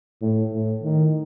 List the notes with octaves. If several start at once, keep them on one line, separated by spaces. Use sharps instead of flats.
A2
A2
D#3